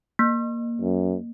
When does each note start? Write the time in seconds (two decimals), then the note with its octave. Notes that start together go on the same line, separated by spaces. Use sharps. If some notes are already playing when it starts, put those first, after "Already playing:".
0.19 A#3
0.81 F#2